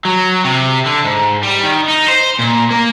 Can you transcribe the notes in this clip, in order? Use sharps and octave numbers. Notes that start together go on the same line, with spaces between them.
F#3
C3
D3
G#2
G3
D#3
D#4
C5
A#2
A#3